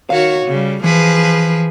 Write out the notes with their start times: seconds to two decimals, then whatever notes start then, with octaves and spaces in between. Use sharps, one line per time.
0.10 D#3 F#4 C#5 F5
0.46 C#3 G3
0.84 E3 F3 G#4 B4